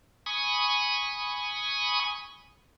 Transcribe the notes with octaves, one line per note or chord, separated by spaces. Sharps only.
G#5 B5 C#6 D#6